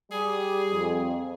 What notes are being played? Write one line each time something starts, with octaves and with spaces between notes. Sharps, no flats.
G3 G#4
F2